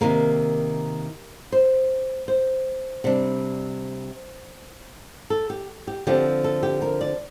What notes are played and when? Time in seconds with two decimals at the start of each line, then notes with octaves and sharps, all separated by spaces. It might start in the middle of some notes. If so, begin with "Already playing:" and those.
0.01 C3 D#3 A#3 A#4
1.52 C5
2.28 C5
3.04 C3 G3 D4
5.30 A4
5.50 G4
5.87 G4
6.07 D3 F3 C4 G4
6.44 A4
6.63 G4
6.82 A#4
7.01 D5